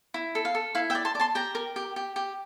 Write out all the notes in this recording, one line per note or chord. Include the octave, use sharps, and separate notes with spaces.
E4
A4
F5
A4
E4 F5
E5 G5
D5
A5 C6
D5
A5 C6
G4 G5 A#5
A#4
G4
G4
G4